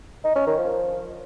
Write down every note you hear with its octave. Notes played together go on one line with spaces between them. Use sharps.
D#4
C#4
D#3
F3